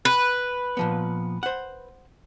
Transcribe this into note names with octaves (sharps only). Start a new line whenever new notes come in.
B4
A#2 F3 B3
C5 F#5